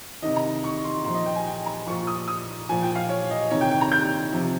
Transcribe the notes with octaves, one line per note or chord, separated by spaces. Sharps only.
C3 D#3 D#5
A#5
C#6
C6
A#2 F3 C6
D#5
G5
G#5
G5
A#5
A#2 F3 C#6
D#6
D#6
A#2 F3 G#5
G5
F5
C#5
D#5
C3 D#3 C#5
G5
G5
A#5
G6
C3 F3